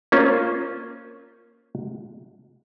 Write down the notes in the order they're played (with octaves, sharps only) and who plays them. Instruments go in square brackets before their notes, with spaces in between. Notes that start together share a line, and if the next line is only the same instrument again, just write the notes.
[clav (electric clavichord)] A#3 C#4 F4 C5